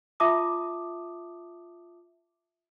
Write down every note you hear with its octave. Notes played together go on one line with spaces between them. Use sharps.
F4 E5 A5 D6 D#6